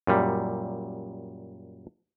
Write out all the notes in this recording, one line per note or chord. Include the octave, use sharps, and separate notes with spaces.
F#2 A#2 G3